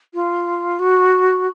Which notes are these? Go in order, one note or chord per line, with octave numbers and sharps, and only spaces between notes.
F4
F#4